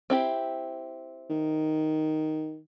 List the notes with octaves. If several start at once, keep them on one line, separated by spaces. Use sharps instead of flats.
C4 E4 G4
D#3